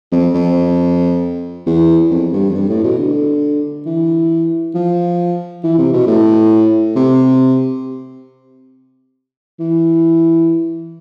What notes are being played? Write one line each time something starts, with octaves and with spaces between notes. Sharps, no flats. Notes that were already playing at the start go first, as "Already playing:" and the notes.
F2
F2
E2
F2
G2
F2
G2
A2
B2
D3
E3
F3
E3
C3
B2
A2
C3
E3